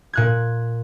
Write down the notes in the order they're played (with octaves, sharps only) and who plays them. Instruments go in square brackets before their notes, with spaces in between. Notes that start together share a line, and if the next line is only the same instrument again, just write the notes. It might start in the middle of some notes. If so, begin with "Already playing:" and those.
[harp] A#2 F#6 G#6